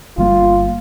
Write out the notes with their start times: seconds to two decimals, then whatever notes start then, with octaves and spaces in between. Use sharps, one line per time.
0.18 G1 G3 A#3 F4